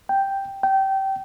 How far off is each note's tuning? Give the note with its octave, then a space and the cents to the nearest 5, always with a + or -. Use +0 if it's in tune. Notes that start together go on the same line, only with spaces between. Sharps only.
G5 +0
G5 -20